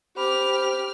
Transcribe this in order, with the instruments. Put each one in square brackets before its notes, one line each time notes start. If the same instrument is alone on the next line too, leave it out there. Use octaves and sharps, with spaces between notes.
[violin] G4 F6 [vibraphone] C5 B5 D6